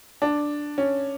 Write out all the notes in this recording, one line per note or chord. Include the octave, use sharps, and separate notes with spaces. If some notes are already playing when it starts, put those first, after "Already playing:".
D4
C#4